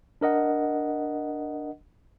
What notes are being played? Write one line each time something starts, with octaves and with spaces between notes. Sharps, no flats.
D4 A#4 D#5 F#5